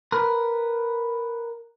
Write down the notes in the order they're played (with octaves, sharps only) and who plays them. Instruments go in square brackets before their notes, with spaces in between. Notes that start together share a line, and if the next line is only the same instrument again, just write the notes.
[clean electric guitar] A#4 B4